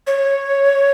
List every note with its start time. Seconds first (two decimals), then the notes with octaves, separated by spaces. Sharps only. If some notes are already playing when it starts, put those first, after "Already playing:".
0.07 C#5